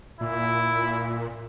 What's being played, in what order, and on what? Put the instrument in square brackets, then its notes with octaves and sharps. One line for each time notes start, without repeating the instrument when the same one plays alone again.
[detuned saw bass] A#2 [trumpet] E4